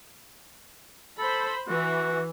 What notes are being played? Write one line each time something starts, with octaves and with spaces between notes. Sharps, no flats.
A4 C5 B5
E3 F#4